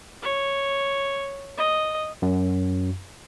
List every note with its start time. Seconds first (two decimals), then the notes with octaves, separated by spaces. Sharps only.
0.22 C#5
1.58 D#5
2.22 F#2